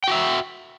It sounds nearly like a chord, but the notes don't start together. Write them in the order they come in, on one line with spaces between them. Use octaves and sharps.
G5 F#4 E5